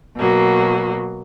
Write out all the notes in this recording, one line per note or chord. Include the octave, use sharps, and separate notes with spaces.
B2 F#3 A#3